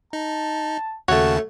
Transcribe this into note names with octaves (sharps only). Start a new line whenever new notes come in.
D#4 A5
D#2 C#3 A3 F#4 C#5 A5